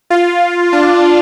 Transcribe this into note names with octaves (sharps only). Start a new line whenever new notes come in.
F4
D4